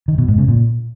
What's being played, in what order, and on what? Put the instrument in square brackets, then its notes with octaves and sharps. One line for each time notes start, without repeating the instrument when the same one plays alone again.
[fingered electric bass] D#3
B2
G#2
C#3
A#2